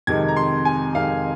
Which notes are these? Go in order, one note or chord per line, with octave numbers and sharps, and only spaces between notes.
F2 C3 D#3 G#3 G#6
A#5
C6
G#5
F2 C3 D#3 G#3 F5